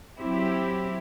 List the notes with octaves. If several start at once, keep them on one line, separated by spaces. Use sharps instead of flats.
F#3 C4 E4 G4